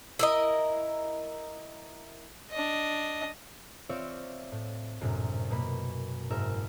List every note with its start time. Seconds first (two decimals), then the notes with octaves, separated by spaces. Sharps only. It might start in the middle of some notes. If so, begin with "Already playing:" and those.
0.19 E4 A#4 D#5
2.51 D4 D#5
3.89 C4 F4 C#5 D5 E5 F5
4.52 A2
5.01 A#1 F#2 A2 C3
5.50 B2 A#3 B5
6.30 F#1 G#2 A#4 E5 F6